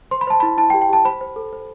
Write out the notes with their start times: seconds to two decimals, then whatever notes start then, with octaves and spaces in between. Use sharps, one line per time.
0.11 C5 C6
0.21 B5
0.27 C5 A5
0.40 E4 B5
0.58 E4 A5
0.70 G5
0.74 G4
0.82 G5
0.89 G4 A5
1.05 C5 B5
1.21 C5
1.36 A4
1.53 C5